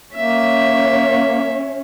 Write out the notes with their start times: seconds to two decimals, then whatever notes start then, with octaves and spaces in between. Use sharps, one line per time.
0.14 A#3 C#4 C#5 E5